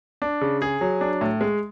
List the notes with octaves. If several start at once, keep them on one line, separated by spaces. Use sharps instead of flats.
D4
C#3
G#4
F#3
D4
A2
G#3